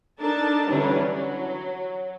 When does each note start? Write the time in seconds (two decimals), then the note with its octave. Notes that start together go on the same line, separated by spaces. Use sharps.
0.21 D4 D#4 A4 A#4 A5
0.69 D3 E3 F#3 G3 C#4 D4
1.07 F#3